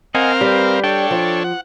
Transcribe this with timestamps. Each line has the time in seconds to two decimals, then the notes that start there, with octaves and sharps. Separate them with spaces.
0.15 C4 A#4 D#5 F5 F#5 G#5
0.41 G3 B4
0.84 D4 A4 C#5 G5
1.11 F3
1.44 F#5